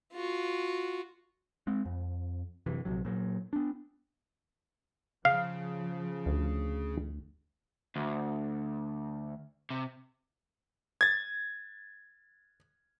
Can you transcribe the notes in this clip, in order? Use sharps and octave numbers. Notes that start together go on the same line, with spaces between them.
F4 F#4
G#3 C4
F2
F#2 C3 E3
A#1 C3 F#3
A#2 F#3
B3 D4
C#3 F3 F5
D2
D2
C3
G#6 A6